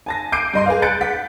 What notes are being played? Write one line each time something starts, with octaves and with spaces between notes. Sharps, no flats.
G#5 A5 A#6
D6 G6 C7 D7 D#7
G2 D#5 C6
G#4 B4 F5
F#6 G6 A6 C#7 D7
F#5 B6